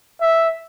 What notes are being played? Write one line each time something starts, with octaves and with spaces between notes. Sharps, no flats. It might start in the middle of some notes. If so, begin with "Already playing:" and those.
E5